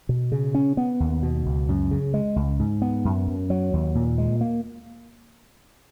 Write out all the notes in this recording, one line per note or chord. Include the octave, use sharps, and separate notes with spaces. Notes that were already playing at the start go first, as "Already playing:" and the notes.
B2
C#3
C#4
B3
D#2
B2
C#2
F#2
C#3
G#3
C#2
G#2
B3
F#2
F#2
F#3
D#2
A#2
G#3
A#3